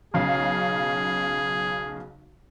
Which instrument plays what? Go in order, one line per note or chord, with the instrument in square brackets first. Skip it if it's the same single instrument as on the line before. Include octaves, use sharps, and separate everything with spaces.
[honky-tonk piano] B1 C#3 F5 [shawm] G#4